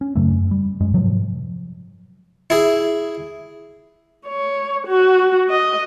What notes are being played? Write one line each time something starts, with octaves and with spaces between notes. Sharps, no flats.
C#4
F#2 C#3 F#3 A3
F#2
G3
F#2 G#3
G#2 C3 F3 F#3
E4 G#4
C#5
F#4
D#5